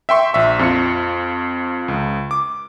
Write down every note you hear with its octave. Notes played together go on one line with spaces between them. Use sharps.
E5 G5 C6 C#6
A#1 E5 C#6
F2 F4 C#7
C#2
D6